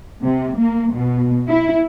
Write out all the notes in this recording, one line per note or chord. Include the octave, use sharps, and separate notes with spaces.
C3
A#3
B2
E4